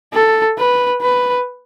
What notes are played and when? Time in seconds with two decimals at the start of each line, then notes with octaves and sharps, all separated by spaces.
0.13 A4
0.58 B4
1.02 B4